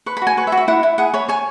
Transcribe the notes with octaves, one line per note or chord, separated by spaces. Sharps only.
B4 C#6
B5
F#4
G#5
B4 C#6
E5
F#4
E5
E4 F#5
E4
G#4 F#5
C#5 B5
C#5 G#5